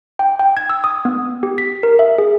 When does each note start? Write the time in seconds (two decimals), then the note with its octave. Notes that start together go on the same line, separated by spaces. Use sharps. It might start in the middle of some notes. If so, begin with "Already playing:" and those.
0.19 G5
0.39 G5
0.57 G#6
0.70 E6
0.84 D#6
1.05 B3
1.43 G4
1.58 B6
1.83 A#4
1.99 E5
2.18 G#4